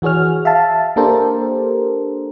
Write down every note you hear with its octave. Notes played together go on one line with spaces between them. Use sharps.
E3 F#4 G#4 C#5 F6
E5 F5 A5
A#3 D4 G4 A4 A#4 C5